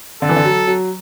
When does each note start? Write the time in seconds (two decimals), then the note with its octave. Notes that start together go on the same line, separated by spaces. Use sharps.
0.22 D3 A4
0.29 E3
0.36 D3
0.45 F#3
0.67 F#3